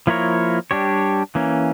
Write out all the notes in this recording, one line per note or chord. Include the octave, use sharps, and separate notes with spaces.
F3 A#3 E4 A#4 C#5
G3 D4 G4 C#5
E3 A#3 C#4